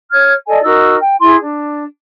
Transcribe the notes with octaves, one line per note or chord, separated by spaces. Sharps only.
C#5 F6 G#6
A4 D5 D#5 G#5
D#4 F#4 A#4 E6
G5
E4 G#4 C6
D4